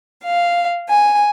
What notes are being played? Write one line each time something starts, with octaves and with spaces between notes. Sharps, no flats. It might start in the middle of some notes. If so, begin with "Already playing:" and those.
F5
G#5